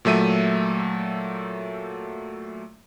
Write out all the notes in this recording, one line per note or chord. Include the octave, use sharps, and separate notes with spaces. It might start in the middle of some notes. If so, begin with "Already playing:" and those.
A#2 F#3 A3 E5 D#7